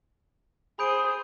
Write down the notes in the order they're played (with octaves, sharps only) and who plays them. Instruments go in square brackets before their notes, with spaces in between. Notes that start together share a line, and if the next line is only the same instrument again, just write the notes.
[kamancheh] G#4 C5 [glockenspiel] B5 G6 D7 [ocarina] D#6